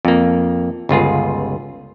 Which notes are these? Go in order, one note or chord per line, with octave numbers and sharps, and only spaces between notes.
F2 A#3
G1 C#2 F4 G#4